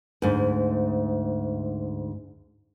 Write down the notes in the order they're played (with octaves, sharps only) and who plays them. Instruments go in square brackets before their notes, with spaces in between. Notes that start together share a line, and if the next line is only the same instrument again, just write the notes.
[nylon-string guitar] D2 G#2